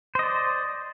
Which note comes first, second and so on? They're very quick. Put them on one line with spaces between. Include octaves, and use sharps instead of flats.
C5 D#5 D5